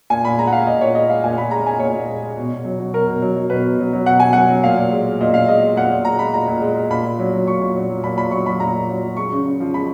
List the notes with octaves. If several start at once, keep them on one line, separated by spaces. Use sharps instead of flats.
A#2 G#5
A#2 B5
G#3 A#5
F#5
G#3 F5
A#2 D#5
A#2 C#5
G#3 D#5
G#3 F5
A#2 G#5
A#2 B5
G#3 A#5
G#3 G#5
A#2 C#5
A#2
G#3
G#3
B2
B2
F#3
F#3
B2 A#4
B2
F#3
F#3
B2 B4
B2
F#3
F#3
B2 F#5
B2 G#5
F#3 F#5
F#3
A#2 F5
A#2
G#3
G#3
A#2 D#5
A#2 F5
G#3 D#5
G#3
A#2 F#5
A#2
G#3 A#5
G#3 B5
A#2 A#5
A#2
G#3
G#3
A#2 B5
A#2
F#3
F#3
A#2 C#6
A#2
F#3
F#3
A#2 B5
A#2 B5
F#3 C#6
F#3 B5
A#2 A#5
A#2
F#3
F#3
G#3 C#6
C#3
C#3
F3
G#3 B5